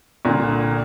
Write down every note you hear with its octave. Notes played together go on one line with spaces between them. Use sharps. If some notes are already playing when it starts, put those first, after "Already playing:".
C2 A#2 D3